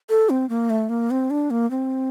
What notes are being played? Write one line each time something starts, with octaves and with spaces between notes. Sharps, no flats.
A4
C4
A#3
A3
A#3
C4
D4
A#3
C4